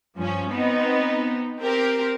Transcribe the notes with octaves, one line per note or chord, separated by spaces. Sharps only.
G2 F3 C#4
B3 C4 D#4
C4 G4 A#4